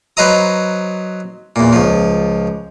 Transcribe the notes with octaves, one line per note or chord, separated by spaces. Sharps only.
F#3 B4 C5 D#5 A#5 D#6
E2 A#2
C#2 F3